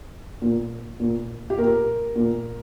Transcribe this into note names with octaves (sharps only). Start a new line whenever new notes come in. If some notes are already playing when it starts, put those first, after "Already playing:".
A#2
A#2
G4
A#2 A#4
A#2